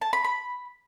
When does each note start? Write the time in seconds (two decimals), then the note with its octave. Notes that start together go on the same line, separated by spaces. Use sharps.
0.01 A5
0.13 B5
0.24 B5